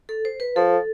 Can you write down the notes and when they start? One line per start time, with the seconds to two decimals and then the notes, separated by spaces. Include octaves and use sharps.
0.09 A4
0.25 C5
0.40 B4
0.56 F3 A4